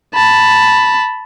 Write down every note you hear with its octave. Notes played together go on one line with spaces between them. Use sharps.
A5 B5